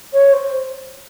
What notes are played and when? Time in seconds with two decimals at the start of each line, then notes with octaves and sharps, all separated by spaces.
0.13 C#5
0.33 C5